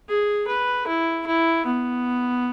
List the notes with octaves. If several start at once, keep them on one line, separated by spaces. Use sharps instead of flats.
G#4
B4
E4
E4
B3